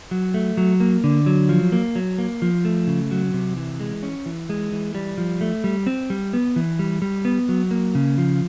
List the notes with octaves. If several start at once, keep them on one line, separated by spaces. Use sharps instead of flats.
F#3
A3
F#3
A#3
D3
F#3
F3
A#3
F#3
A#3
F3
A3
C#3
F#3
C3
E3
G#3
C#4
E3
G#3
E3
G3
F3
A3
G3
C4
G3
B3
E3
G3
G3
B3
F#3
A#3
C#3
F3